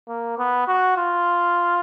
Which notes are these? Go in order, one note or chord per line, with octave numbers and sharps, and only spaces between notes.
A#3
B3
F#4
F4